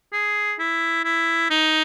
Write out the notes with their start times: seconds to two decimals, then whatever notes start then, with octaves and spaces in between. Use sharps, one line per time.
0.13 G#4
0.59 E4
1.05 E4
1.51 D#4